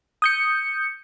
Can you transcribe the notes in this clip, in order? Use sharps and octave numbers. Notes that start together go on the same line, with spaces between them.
D#6 G6 C#7